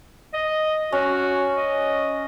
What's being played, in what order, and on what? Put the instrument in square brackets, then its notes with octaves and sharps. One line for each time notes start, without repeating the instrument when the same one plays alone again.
[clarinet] D#5
[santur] C#4 [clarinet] F#4
[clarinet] D#5